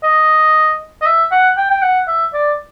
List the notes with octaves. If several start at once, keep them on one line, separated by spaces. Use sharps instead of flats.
D#5
D#5
E5
F#5
G5
G5
F#5
E5
D5